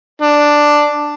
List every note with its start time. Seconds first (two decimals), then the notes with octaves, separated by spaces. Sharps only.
0.22 D4